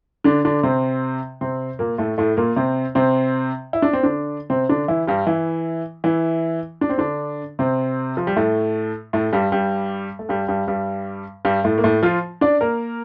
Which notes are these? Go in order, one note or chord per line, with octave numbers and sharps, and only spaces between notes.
D3 D4
D3 D4
C3 C4
C3 C4
A#2 A#3
A2 A3
A2 A3
A#2 A#3
C3 C4
C3 C4
E4
D4
C4
D3 D4
C3 C4
D3 D4
E3 E4
G2 G3
E3 E4
E3 E4
D4
C4
D3 D4
C3 C4
F3
G3
A2 A3
A2 A3
G2 G3
G2 G3
A3
G2 G3
G2 G3
G2 G3
G2 G3
A2 A3
A#3
A2 A3
F3 F4
D4 D5
A#3 A#4